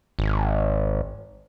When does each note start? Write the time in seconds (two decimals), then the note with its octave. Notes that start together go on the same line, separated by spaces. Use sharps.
0.19 G#1